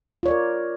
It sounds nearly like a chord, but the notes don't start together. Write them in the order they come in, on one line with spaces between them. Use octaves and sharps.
F4 C#5 D5 A#4